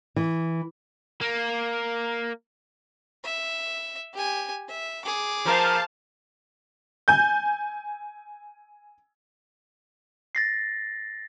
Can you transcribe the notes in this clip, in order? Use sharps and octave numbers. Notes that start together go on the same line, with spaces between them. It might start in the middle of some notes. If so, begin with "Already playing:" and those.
E3
A#3
E5
G4 G#5
E5
G#4 D6
F3 A#4 C5 F5 A5
G#5 G6
A6 A#6 C7